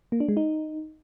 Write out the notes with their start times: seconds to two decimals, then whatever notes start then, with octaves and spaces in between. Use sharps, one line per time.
0.12 A#3
0.20 D4
0.29 G#3
0.37 D#4